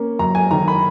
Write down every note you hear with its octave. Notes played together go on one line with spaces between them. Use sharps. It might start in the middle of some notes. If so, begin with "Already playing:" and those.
Already playing: A#3 C#4
F#2 A#5
G#5
D#3 A#5
B5